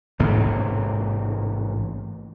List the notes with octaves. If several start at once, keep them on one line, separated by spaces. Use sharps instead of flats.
A1 G#2 C3 A#3